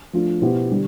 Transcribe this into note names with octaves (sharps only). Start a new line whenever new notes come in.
F3 A3 D4 F4
B2 B3 E4 G4 C5
D3 G3